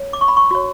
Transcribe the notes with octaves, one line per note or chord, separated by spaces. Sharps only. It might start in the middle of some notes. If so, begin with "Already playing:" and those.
Already playing: C#5
D6
C#6
B5
C#6
F#4 C#5